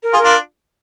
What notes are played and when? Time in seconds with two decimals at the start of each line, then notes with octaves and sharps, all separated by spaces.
0.03 A#4
0.13 F4 G#4
0.18 A#4
0.23 D4 F4